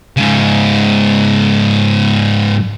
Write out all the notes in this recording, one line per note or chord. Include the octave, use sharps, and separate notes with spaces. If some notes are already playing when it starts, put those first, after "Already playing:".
G#2 C#3